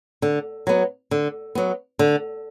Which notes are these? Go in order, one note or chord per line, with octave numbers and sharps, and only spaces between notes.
D3
F#3 B3
D3
F#3 B3
D3